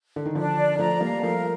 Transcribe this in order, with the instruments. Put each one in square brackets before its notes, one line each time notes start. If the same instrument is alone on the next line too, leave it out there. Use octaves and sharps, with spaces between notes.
[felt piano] D3
D#3
[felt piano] D3 F3 [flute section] D4
[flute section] D5
[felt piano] F3 A3 [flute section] A#5
[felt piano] G3 A#3 [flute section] F5
[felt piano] F3 A3 [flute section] A#4